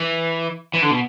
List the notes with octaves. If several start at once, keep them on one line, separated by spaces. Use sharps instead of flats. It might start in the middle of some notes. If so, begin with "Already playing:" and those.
Already playing: E3
E3
D3
B2